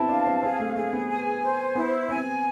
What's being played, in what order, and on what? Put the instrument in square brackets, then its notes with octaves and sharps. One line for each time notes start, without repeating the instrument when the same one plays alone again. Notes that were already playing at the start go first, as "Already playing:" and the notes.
Already playing: [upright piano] B3 C4 E4 [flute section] A5
[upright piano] D4 [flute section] F5
[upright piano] C4
[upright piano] C4 [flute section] G#4
[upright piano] A3
[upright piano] A3 [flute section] G#4
[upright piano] B3
[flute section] G#5
C5
[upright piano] B3 [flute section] E4
[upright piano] C4 [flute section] G#5